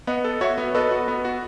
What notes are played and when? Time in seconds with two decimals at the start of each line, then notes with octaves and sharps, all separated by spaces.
0.07 B3 D#5 F#5
0.24 A4
0.41 F#4 C#5 E5
0.58 B3
0.75 A4 B4 D#5
0.91 F#4
1.08 B3
1.25 F#4